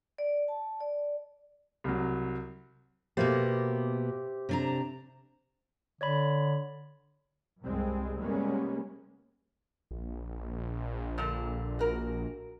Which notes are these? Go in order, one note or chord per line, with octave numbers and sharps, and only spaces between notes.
D5
A5
D5
C2 F#3
B2 A#3 B3 G4 C5 E5
C3 D4 A#5
D3 C#5 D5 B5
C2 G2 G3 G#3 C4
C3 G3 G#3 A#3 B3 C#4
A#1
A#2 D3
F#4 A#4